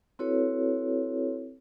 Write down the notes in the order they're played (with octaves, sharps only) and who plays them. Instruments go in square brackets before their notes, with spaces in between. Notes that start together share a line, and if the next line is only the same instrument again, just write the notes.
[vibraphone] C4 E4 F#4 A4 B4 C#5